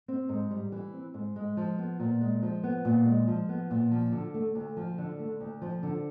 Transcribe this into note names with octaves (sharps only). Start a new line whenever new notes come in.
C4
G#2
G3
E3
C4
G#2
G#3
F3
B3
A#2
G#3
F3
B3
A#2
G#3
F3
B3
A#2
F3
D3
A3
D2
F3
D3
A3
D2
F3
D3